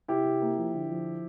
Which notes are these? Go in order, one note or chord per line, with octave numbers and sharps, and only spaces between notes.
C3 E4 G4
C3
A#3
F3
D3
F3